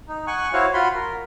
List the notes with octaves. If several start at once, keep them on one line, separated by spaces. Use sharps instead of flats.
D#4
F#5 G#5 C#6 F#6
E4 F#4 C5 C#5 F5
F4 F#4 B5 C6
A#4